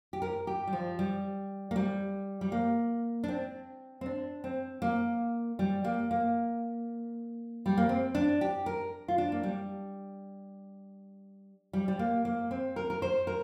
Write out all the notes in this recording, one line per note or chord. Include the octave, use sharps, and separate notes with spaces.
G4
A#4
G4
G3
F3
G3
A#3
G3
G3
A#3
D4
C4
C4
D4
C4
A#3
G3
A#3
A#3
G3
A#3
C4
D4
G4
A#4
F4
D4
A#3
G3
G3
G3
A#3
A#3
C4
A#4
A#4
C5
A#4